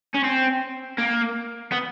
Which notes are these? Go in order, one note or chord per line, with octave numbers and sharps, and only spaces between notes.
C#4
C4
A#3
B3